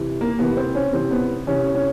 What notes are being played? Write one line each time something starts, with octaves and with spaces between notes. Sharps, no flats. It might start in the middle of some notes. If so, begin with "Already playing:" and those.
Already playing: C3 E3
A#3
C3 E3 B3
C4
C#4
C3 E3 C4
B3
C3 E3 C#4
C#4